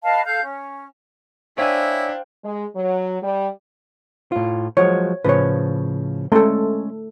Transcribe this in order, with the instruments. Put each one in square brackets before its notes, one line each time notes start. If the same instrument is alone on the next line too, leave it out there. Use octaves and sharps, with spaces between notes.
[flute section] B4 D#5 F5 A5
A4 F5 G6
C#4
[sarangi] D4 [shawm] E4 [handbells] C5 F5 G5 [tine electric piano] C#5 E5 G#5
[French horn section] G#3
F#3
G3
[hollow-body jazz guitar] A2 F4
[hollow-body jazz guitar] F3 F#3 G#3 [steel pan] C#5
[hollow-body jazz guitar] A2 C#3 F3 [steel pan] B4 C#5
[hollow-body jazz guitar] G#3 C#4 C6 [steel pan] A3 A4